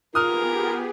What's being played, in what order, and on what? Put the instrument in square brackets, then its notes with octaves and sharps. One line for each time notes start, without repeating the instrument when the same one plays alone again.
[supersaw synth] B3 G4 G#4 [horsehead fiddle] F4 [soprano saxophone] A#4 [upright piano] D#6 F6